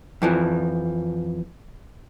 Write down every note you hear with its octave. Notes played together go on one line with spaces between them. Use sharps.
F2 E3 F3